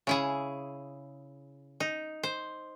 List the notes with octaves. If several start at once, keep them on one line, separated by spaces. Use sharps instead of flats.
C#3 E4 G#4
D#4
C5